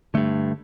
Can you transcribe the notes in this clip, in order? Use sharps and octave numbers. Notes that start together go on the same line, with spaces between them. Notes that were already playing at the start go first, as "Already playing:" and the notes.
G2 D3 A3